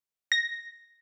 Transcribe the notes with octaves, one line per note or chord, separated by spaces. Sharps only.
A#6